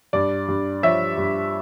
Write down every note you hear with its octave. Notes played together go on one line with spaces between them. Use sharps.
G2 D5
G2
F3 C#5 E5
G2